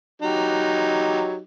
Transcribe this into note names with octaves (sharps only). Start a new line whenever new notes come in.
F#3 D#4 G4